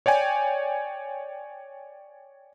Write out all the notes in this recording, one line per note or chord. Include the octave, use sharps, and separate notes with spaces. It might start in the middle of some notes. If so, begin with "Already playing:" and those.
C#5 D5 G5 G#5